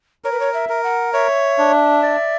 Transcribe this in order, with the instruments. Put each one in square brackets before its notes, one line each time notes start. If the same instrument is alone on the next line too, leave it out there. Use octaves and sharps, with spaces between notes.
[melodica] A#4 [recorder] C#5
[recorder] B4
C#5
E5
[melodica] A#4
[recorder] F#5
[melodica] C#5 [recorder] E5
[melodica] D4
D5